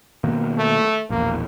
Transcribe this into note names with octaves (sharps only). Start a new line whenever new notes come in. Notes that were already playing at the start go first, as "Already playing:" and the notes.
B2 D#3 A#3
A3
E1 A#1 A#3